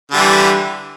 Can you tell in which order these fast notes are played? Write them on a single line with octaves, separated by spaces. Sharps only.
D3 G3 E3